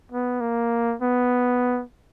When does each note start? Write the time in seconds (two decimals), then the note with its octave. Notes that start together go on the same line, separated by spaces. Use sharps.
0.12 B3
0.41 A#3
1.02 B3